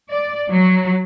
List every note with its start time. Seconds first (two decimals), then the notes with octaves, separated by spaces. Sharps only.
0.11 D5
0.51 F#3